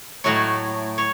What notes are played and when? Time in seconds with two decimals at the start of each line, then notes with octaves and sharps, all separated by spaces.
0.24 A2 F#3 A3 C#5
0.98 C#5